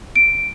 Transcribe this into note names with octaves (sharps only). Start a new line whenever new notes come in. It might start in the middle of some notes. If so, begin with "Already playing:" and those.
D7